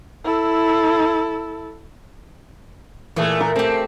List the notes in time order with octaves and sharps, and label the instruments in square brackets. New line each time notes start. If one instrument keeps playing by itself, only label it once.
[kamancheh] E4 A4
[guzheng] A#2 G#4 [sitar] E3 A3
[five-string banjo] A#4
[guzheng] A3 G4 [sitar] C4